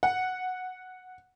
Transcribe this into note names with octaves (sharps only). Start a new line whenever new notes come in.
F#5